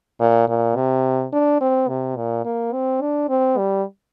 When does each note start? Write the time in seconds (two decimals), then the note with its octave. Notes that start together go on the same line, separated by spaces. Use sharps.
0.20 A#2
0.48 A#2
0.76 C3
1.32 D4
1.61 C4
1.88 C3
2.16 A#2
2.45 A#3
2.73 C4
3.01 D4
3.29 C4
3.57 G3